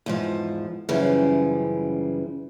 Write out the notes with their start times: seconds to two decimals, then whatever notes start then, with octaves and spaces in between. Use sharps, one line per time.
0.06 E2 G#2 F3
0.89 F#2 C#3 E3 F3 G3